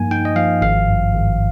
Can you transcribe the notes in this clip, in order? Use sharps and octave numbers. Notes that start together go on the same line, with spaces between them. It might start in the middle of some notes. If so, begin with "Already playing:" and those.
Already playing: G2 F3 A#3 D#4 G#5
D#4 G5
D#5
F3 F5
G#1 F5
G2
G#1